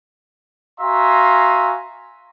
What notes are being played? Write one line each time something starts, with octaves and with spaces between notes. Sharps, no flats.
F#4 E5 F5 G#5 A#5 C6